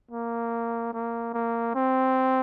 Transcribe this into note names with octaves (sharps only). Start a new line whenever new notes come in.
A#3
A#3
A#3
C4